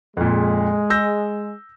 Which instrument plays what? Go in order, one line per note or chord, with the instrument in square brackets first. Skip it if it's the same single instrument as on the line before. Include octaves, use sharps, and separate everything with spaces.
[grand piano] F2 A#2 [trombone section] G#3
[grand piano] E6 G6 A#6